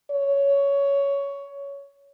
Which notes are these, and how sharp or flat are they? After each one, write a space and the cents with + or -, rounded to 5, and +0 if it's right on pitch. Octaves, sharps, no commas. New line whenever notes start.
C#5 +15